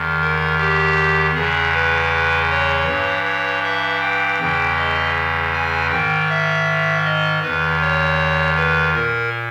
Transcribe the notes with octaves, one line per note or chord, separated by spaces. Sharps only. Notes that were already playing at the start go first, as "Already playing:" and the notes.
Already playing: E2 D#3
A#4
G4
E2 C#3 E3 G#4
B4
C#5
G2 E3
C#5
E5
G5
E2 C#3 E3 G5
D#5
G#5
G#2 D#3 G5
E5
D#5
E2 D#3 B4
C#5
B4
A#2 A#4